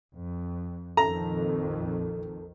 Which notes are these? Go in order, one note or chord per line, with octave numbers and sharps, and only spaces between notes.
F2
A#1 F2 D#3 A4 A#5